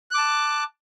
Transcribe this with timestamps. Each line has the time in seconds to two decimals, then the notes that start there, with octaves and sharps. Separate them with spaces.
0.11 F#6
0.14 D6
0.18 A5